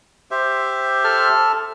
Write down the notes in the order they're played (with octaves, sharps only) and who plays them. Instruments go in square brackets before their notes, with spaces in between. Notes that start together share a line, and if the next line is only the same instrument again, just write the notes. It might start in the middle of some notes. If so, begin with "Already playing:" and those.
[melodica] G4 C5 E5
[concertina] A4 A5 F6